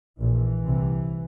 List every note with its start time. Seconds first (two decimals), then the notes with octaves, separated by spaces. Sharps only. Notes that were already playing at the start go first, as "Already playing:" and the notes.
0.19 A#1 A#2 E3
0.66 C2 C3